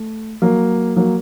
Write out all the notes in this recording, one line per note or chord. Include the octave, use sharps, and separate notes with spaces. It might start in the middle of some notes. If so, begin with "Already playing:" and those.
Already playing: A3
F#3 A#3
F#3 A#3